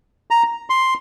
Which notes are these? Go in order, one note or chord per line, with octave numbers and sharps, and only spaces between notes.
A#5
C6